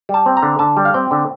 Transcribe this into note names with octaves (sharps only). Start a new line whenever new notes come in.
G3
A5
C4
A#5
D3
D3 A5
G3
F5
C4 G5
D3